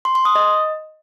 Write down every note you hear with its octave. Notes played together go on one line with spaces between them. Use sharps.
C6
C6
D#6
D#5